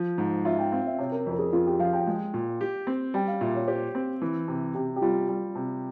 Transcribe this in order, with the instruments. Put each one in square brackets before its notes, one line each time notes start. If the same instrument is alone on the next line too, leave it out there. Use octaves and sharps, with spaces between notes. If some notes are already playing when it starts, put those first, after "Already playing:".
Already playing: [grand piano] F3
G#2
[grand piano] F4 [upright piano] E5
[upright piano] G5
[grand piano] C4 [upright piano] F5
[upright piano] E5
[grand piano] C3 [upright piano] C#5
[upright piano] A#4
[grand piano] F2 [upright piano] A#4
[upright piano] G#4
[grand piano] F2 [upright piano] F4
[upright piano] G4
[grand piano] F3 [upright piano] F5
[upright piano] G5
[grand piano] G#3
A#2
G4
C4
[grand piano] G3 [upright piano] G5
[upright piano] F5
[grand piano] A#2 [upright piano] E5
[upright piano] C#5
[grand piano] G4 [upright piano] C5
[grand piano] C4
E3
C3
[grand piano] C3 [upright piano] G4
[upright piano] G4
[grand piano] G3 [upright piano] F4
[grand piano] G3
C3